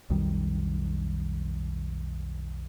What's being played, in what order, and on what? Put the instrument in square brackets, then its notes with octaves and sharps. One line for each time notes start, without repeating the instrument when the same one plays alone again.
[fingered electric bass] B1 F2 D#3 G3